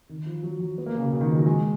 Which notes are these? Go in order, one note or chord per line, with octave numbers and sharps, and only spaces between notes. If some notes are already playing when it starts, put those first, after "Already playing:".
D#3
F3
F#3
F#3
B3
A#3
C#3
B2
C#3
D#3
F3
F#3
G#3